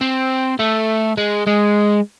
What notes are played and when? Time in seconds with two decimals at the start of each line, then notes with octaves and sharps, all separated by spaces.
0.01 C4
0.59 A3
1.17 G#3
1.47 G#3